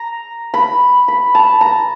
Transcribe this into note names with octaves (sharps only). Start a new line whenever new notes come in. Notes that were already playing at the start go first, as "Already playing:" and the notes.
Already playing: A#5
B5
B5
A5
A#5